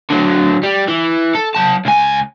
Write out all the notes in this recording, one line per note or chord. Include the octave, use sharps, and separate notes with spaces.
D3 F#3
G3
E3
A4
F#3 A5
C#2 G#5